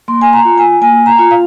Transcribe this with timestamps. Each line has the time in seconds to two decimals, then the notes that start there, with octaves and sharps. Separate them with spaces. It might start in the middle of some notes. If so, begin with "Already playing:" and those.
0.08 A#3 C6
0.21 G#5
0.33 A#5
0.45 F4
0.58 G#5
0.82 A#3 G#5
1.06 A#5
1.19 F4
1.31 F5